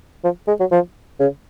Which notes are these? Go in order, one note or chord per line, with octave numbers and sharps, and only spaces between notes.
F3
G#3
F#3
F3
C#3